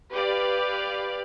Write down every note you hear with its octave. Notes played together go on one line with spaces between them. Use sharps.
G4 B4 D5 F5